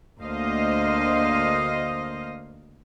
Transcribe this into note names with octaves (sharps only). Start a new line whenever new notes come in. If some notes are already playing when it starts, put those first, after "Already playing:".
D2 A#3 C5 D#5 F5